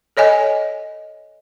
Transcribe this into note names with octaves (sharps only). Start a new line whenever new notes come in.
A4 C#5 D#5 G#5